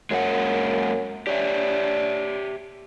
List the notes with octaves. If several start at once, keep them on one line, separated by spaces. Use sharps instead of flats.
F#2 G#3 A#3 F#5
D4 G4 C#5 E5